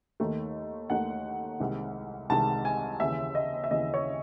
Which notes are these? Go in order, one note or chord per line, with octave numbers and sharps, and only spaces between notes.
D#2 D#3 A3 D#4
D#2 D#3 A3 D#4 F#5
C2 C3 D#3 G#3
C2 C3 D#3 G#3 A5
G#5
D#2 C#3 E3 E5
D#5
E5
D#2 C#3 E3 D#5
C#5